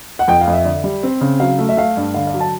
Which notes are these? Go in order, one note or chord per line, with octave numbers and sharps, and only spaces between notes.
F#5
F2 G5
F5
F2
E5
D3
G3
C4
C#3
F#3 F5
A3
E5
A3 F5
G2
D3 F5
F5
F#3
A5